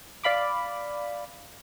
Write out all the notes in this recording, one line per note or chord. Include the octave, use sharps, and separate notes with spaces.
D5 F5 B5 D6